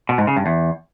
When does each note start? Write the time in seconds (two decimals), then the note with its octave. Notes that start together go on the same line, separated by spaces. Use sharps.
0.09 B2
0.18 G#2
0.27 C#3
0.37 G2
0.46 E2